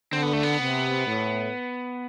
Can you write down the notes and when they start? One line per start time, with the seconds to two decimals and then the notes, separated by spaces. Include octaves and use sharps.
0.12 D3 C4
0.23 B3
0.33 A3
0.43 B3
0.59 C3
1.07 A2